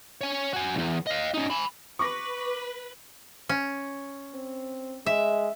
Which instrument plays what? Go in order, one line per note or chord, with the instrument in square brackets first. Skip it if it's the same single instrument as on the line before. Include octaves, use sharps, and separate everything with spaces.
[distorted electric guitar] C#5 G#5
F#4 G#5
B1 E2
D#5 F5
C#4 D#4
G#5 B5
[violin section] B4 [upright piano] C#6 D6 A#6
[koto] C#4
[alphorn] C4
[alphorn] G#3 [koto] E5